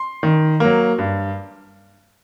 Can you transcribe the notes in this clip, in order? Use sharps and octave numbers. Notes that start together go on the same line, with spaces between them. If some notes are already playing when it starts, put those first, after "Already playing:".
Already playing: C6
D#3
F#3 A#3
G2